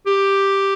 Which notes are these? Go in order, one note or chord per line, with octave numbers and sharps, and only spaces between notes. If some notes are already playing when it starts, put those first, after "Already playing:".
G4